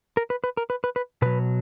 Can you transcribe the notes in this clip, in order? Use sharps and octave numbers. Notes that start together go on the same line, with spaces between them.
A#4
B4
B4
A#4
B4
B4
B4
B2 F#3 B4